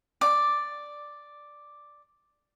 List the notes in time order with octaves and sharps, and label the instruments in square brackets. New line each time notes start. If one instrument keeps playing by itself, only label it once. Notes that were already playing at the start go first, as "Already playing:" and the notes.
[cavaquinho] D5 D6